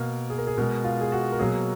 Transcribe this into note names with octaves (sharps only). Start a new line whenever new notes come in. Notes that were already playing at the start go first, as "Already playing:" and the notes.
Already playing: B2 A#3 A#4
G#4
A#4
G#4
B2 G#3 A#4
F4
G#4
F#4
A#4
B2 F#3 A#3 G#4